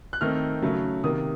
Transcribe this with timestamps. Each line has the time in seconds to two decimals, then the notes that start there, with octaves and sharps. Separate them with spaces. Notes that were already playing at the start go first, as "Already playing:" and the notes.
0.13 F#6
0.21 D#3 A3 C4 D#4 F6
0.62 C#3 F#3 A3
1.03 C3 D#3 A#3 D#6